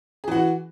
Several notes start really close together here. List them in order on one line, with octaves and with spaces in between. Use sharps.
G#4 E3 F#4